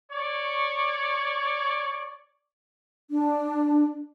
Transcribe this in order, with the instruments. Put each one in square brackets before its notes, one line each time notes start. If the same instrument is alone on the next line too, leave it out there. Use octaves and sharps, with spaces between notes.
[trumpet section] C#5 D5 C#6
[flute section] D4